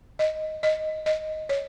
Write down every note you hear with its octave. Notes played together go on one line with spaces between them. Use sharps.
D#5
D#5
D#5
C#5